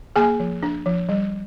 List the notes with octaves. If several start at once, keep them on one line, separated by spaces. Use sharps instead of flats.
A#3 G#4 G#5
F3
D4
F3
G3